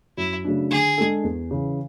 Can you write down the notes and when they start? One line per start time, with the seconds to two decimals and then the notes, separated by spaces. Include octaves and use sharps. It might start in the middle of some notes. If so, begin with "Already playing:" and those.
0.17 F#2 E4
0.44 C#3 F#3 A3 D4
0.71 D3 G#4
0.98 G#3 D4 A4
1.24 E2
1.51 C#3 E3